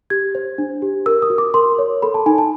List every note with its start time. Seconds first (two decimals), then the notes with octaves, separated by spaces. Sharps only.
0.10 G4 G#6
0.35 C5
0.58 D4
0.82 G4
1.06 A#4 E6
1.22 D#6
1.30 F#4
1.38 D6
1.54 A#4 C6
1.79 C#5
2.02 A4 B5
2.14 A5
2.26 D#4 G#5
2.38 A5